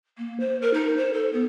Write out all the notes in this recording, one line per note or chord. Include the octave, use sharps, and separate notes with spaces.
A#3
C5
A#4
D#4
C5
A4
B3